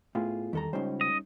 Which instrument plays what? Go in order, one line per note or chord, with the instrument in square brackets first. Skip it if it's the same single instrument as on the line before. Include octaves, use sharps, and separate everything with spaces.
[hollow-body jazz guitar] A2 [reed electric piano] B3 F4 G#4
[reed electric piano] E2 G3 [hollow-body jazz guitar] D#3 A4 A#5
[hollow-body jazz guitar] C#2 C5 [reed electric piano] G3 C#4 D#4
[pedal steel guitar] D#5